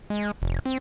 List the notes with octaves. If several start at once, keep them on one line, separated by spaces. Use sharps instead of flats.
G#3
F1
C4